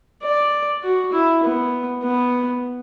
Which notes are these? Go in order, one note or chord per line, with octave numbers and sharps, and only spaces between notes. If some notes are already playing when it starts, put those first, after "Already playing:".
D5
F#4
E4
B3
B3